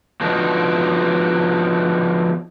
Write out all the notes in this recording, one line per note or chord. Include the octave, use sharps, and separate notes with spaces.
F3 B3 D4 D#4 F#4